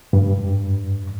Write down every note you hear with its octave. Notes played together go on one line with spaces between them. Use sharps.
G2